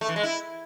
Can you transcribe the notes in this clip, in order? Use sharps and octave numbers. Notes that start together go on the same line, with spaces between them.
A3
E3
G#3
E4